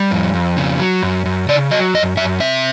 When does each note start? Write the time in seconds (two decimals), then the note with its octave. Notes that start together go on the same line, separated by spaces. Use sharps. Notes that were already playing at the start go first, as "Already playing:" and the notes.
Already playing: G3
0.11 F2
0.34 F2
0.57 C#3
0.80 F#3
1.03 F#2
1.26 F#2
1.49 C#3 D5
1.71 F#3 D#5
1.94 F#2 D#5
2.17 F#2 E5
2.40 C3 E5